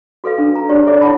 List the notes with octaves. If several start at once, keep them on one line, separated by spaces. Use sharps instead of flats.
F#4 A4 B4 F5
D4
A#5
D4 G4 C#5 D5
A4 C#5 E5 D6
E4 C#5 F#5 A5 B5